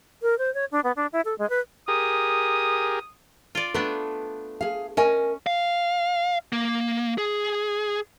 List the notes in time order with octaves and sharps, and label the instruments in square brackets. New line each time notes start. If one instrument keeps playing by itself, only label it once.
[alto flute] A#4
C5
C#5
D4
B3
D4
E4
A4
G#3
B4
[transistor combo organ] G4 G#4 A#4 [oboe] D#6
[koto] F4 D5
[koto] A3 B3 D4 [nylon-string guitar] B4
[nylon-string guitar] G#4 F5
[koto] C#4 [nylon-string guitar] A#4 D#5 G#5
[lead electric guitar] F5
A#3
G#4